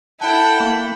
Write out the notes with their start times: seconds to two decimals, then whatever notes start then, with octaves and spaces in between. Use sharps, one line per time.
0.21 E4 A4 F#5 G5 A5
0.60 A#3 B5